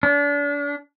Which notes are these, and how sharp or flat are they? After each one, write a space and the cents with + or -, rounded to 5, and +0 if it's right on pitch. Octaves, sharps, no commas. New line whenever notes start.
D4 -35